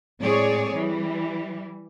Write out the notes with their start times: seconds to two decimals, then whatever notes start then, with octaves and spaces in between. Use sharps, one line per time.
0.21 A2 G#3 C4 G#4 C#5 D5
0.75 E3 G3